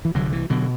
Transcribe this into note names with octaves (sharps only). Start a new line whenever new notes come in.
E3
C2 D3 F#3
E3
B2 D3 F#3